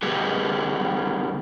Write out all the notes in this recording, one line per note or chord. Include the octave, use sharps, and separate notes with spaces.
C#3 G3 B3 G4 G#4